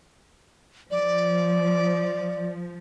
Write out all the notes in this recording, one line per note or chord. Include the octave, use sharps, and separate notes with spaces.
F3 D5